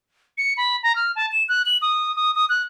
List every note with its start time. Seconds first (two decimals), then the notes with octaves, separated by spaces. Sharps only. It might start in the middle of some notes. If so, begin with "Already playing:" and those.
0.38 C#7
0.57 B5
0.83 A#5
0.96 F6
1.16 A5
1.32 E7
1.49 F#6
1.66 F#7
1.82 D#6
2.16 D#6
2.35 D#6
2.49 F#6